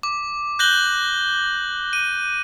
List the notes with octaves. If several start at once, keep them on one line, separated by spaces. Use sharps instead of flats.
D6
F#6 G6 A#6 F#7 G7
D#7